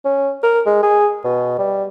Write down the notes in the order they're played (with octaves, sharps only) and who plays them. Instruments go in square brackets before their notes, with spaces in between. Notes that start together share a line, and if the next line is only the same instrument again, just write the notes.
[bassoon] C#4
A#4
G#3
G#4
B2
G3